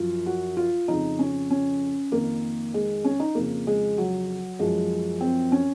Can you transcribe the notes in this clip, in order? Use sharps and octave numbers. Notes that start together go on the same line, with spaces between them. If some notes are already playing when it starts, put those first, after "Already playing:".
Already playing: F#2 F3 F4
F#4
F4
F2 C#3 F3 D#4
C#4
C#4
F2 D#3 A#3
G#3
C#4
D#4
F2 C#3 F3 A#3
G#3
F#3
F#2 F3 G#3
C4
C#4